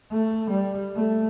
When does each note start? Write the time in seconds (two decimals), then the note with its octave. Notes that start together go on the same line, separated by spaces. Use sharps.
0.12 A3
0.51 G3
0.96 A3